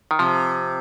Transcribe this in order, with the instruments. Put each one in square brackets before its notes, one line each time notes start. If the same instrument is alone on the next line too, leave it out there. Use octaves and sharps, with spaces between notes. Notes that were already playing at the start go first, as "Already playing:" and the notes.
[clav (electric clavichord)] D#3
[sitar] C3 [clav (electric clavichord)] F3